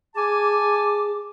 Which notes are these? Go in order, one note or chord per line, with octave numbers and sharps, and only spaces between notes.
G#4 G#5 A5 D6